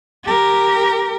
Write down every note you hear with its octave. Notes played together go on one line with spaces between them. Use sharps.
G4 A#4